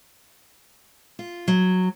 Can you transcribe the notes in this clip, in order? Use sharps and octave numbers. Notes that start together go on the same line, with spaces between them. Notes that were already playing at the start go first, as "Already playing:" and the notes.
F4
F#3